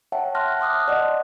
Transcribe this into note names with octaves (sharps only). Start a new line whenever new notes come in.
C#5 E5 F#5 G5 A5
E5 A5 C6 F6 F#6 A#6
A5 C6 D6 D#6 F#6
D5 D#5 F#5